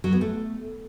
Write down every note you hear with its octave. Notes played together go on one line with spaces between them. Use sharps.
F#3
B3
A3